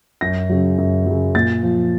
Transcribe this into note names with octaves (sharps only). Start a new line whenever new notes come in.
F#2 A#6
C#3 F#3
F#2
C#3 F#3
A#2 A6
F3